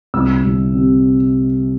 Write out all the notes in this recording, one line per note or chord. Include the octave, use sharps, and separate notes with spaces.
C2 E6
C2
C3